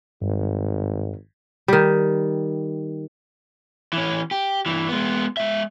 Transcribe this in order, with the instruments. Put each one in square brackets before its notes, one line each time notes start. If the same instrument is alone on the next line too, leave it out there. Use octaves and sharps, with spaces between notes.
[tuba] G#1 [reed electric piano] G2
[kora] D#3 G3
[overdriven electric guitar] E3 C#4
G4
G2 E3
G#3 B3
G#3 E5